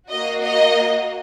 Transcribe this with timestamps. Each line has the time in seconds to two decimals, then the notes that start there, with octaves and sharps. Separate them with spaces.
0.10 A#3 F#4 D#5
0.42 D#5